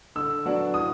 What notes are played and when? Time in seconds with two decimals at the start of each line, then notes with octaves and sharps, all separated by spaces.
0.15 D3 E6
0.45 F#3 B3 D4 F#4
0.74 A2 D#6